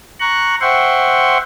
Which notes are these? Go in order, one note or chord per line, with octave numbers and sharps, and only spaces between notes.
A#5 C#6 F#6
C5 E5 F#5 G5 C6 C#6